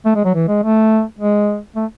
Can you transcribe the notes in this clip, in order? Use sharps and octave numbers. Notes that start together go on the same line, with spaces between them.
A3
G#3
F#3
E3
G#3
A3
G#3
A3